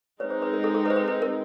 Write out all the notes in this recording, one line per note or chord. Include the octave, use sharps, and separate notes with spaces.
G#3 C4 D#4 B4 C#5
C5
B4
A#4
A4
A4
B4
C5
B4
B4
A#4